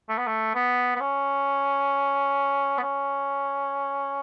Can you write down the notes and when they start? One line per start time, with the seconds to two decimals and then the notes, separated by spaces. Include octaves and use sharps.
0.09 A3
0.18 B3
0.27 A3
0.55 B3
0.96 B3
1.00 C#4
2.78 B3
2.83 C#4